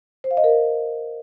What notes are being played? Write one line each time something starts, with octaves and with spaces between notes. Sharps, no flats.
C5
F5
D#5
A#4